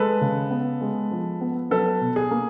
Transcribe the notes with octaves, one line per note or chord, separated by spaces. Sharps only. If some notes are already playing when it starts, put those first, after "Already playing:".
Already playing: G#3 A4 B4
C#3
B3
G#3
F3
B3
F#3 A4 B4
B2
G#4
A#3